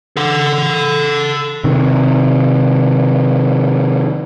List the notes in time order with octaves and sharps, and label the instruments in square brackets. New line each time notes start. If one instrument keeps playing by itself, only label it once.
[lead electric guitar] A4 F#5
[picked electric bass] C3 D#3